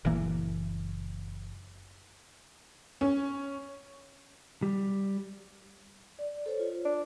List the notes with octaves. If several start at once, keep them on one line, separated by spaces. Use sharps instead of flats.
F#1 A#2 E3 A#3
C#4
G3
D5
A4 C5 C#5
F4
D4